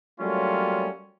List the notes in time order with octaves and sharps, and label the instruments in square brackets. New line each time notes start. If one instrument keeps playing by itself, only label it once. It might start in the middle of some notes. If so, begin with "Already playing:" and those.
[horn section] F#3 G3 A3 A#3 C#4 F4